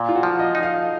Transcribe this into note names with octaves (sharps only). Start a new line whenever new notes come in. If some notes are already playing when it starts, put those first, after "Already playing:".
Already playing: A#2
F4
F#4
F3
D#5
D#4
F5